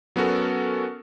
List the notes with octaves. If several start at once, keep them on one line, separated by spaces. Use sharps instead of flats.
F#3 B3 C#4 F#4 A4 A#4